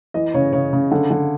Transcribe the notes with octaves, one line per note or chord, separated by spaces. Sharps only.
E3 D#5
C#3 C#5
C#3 C#5
C#3
D3
D3